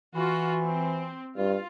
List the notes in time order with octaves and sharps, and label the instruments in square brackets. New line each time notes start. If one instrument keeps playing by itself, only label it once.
[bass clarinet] E3 [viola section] F4 F#4
[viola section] C4
[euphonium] G2 [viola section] F4